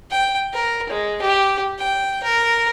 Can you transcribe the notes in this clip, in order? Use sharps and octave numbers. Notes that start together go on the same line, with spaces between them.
G5
A#4
G#3
G4
G5
A#4